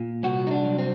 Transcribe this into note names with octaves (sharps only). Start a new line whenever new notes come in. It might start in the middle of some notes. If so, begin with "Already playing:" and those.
Already playing: A#2
C2 F#4
D#4
D4
F#3
C4